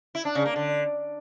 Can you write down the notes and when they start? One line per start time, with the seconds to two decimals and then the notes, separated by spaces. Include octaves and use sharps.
0.15 E4
0.25 D4
0.35 C#3
0.46 A#3
0.56 D3